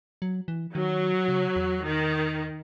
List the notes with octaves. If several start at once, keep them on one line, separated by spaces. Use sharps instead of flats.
F#3
E3
D#3 F#3
C#3
E2
D#3